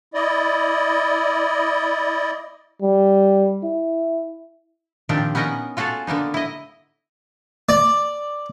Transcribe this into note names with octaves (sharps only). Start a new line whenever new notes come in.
E4 D5 D#5
G3
E4
A#2 D#3 F3 C4 D4 G4
B3 C#4 D#4 A#4 D#5 F#5
F4 F#4 G#4 A4 F5
D3 A#3 B3 D#4
E4 D#5
D5